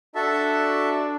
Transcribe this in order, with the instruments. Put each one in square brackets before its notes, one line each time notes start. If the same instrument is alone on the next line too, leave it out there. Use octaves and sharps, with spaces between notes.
[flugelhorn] D4 [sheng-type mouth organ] F#4 A4 E5 A5